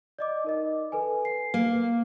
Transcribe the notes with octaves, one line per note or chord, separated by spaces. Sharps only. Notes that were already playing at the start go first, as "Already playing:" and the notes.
D5 D#5 D6
D#4 A#4 D#5
A4 B4 G#5
C7
A#3